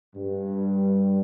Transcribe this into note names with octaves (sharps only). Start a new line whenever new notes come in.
G2